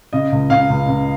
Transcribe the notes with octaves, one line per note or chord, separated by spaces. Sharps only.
C#3 D#5
C#2
C#3 F5
C#2
C#2